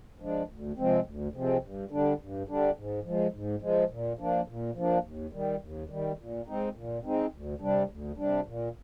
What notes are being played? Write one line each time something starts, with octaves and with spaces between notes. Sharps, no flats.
F3 G#3 D4
D2
C3 F3 G#3 C4
D2
C3 F3 G#3 C4
G2
D3 G3 D4
G2
D3 G3 D4
G#2
F3 G#3
G#2
F3 G#3
A#2
F3 A#3 D4
A#2
F3 A#3 D4
D#2
D#3 G3
D#2
D#3 G3
A#2
G#3 C4 D#4
A#2
G#3 C4 D#4
D2
C3 G3 D4
D2
C3 G3 D4
A#2